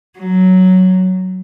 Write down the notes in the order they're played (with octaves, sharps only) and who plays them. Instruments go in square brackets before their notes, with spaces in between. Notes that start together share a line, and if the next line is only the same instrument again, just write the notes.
[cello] F#3